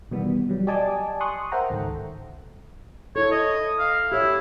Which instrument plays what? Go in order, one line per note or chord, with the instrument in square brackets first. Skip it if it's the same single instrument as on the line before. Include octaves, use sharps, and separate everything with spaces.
[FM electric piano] B2 D#3 E3 G3 B3
F#3 G3
G4 D5 D#5 G#5 A5 D6
C6 C#6 D#6 F#6
A#4 C5 E5 F#5 G5 A#5
C#2 G#2 D#3 A4
[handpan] E4 A4 [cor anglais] C#5
[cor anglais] D#5
F5
[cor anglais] E4 [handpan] G4 C#5 E5